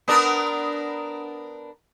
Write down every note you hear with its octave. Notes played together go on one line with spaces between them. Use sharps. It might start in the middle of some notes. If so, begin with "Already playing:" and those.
B3 D4 A#4